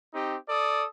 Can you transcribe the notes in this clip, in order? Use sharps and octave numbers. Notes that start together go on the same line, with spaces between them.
C4 D#4 G4
A4 D5 D#6